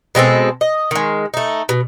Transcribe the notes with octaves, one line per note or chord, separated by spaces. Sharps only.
B2 G#3 C4 A4
D#5
D#3 G#3
A3 D#4
B2